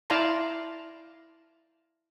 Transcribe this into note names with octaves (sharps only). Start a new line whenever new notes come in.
E4 D5 F5 A5 A#5 C6